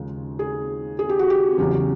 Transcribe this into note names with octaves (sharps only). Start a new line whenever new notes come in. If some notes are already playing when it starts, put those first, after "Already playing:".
Already playing: D#2 C#3 F3 G#3
G#4
G#4
G4
F#4
G4
E2 C#3 F#3 G4